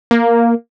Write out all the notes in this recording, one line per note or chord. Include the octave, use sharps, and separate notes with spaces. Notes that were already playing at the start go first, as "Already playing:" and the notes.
A#3